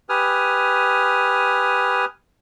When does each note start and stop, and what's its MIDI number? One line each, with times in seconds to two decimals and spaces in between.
0.09 2.05 67
0.09 2.05 71
0.09 2.05 80
0.09 2.05 87
0.09 2.05 89